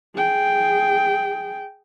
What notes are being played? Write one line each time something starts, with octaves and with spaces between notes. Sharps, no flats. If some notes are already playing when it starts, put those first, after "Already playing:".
G#4 G5